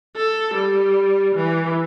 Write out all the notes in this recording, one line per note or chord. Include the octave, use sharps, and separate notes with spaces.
A4
G3
E3